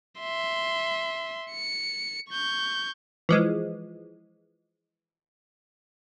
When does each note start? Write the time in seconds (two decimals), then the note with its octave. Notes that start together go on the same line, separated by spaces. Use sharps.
0.20 E5 C6
1.51 C#7
2.29 C#6 G6
3.29 E3 F3 G#3